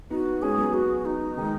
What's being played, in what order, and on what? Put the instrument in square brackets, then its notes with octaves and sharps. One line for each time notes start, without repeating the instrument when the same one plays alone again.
[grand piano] B3 D#4 [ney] F#4
[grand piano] G#3 C#4 [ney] G#4
[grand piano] F#3 B3
[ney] F#4
D#4
[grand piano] D#3 G#3